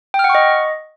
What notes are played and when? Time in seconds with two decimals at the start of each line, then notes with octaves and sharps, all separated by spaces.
0.14 G5
0.19 F6
0.24 F#5
0.29 C#6
0.35 D#5